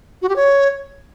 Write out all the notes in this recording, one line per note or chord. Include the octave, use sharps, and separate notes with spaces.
F#4
G4
C#5